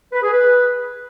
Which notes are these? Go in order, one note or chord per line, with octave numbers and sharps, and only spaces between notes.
B4
G#4
B4